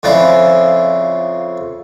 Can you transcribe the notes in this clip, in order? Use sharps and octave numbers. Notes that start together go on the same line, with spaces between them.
F2 C#3 F3 E4 D5